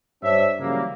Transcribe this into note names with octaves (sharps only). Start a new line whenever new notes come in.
G2 D4 C5 C#5 E5
C#3 E3 F#3 G3 A#3